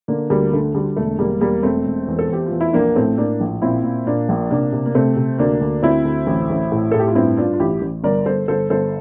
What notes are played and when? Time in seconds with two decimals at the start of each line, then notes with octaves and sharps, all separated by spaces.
0.08 D3 A#3 D4
0.30 D2 G3 A#3
0.53 D3 A3
0.74 D3 G3
0.96 E1 A3
1.19 E1 G3 A#3
1.41 E1 G3 A#3
1.63 E1 A3 C4
1.85 E1
2.08 E2
2.19 A4
2.29 E2 G4
2.46 F4
2.52 E2
2.61 E4
2.73 A#1 A#3 D4
2.96 A2 A3 C4
3.18 A2 A#3 D4
3.41 A#1
3.62 A#2 C4 E4
3.84 A#2
4.06 A#2 A#3 D4
4.29 A#1
4.50 C3 A#3 D4
4.72 C3
4.86 A#3
4.94 C3 A3 C4
5.16 C3
5.38 D2 A#3 D4
5.61 D2
5.83 D2 C4 E4
6.05 D2
6.27 A1
6.50 A1
6.72 A2
6.92 A2 A4
6.99 G4
7.08 F4
7.15 G2 C4 E4
7.37 G2 D4 F4
7.53 F4
7.60 A1 E4 G4
7.81 A1
8.04 G1 A#4 D5
8.26 G1 A4 C5
8.48 G1 A4 C5
8.70 G1 A4 C5